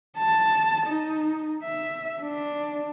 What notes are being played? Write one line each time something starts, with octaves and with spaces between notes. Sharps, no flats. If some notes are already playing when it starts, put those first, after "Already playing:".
A5
D#4
E5
D4